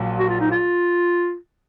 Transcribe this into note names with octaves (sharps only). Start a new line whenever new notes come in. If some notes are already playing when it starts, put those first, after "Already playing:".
Already playing: A#1 A#2 F#3
F#4
F4
D#4
F4